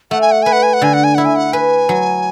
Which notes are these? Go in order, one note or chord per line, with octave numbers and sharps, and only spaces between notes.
A3 F#5
G#5
F#5
B4 G#5
F#5
G#5
F#5
D3 G#5
F#5
G#5
E4 F#5
G#5
F#5
B4 G#5
F#3